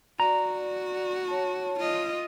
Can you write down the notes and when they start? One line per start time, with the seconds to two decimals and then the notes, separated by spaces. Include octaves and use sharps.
0.20 F#4 D5 A#5
1.28 C#5 A5
1.80 F4 D#5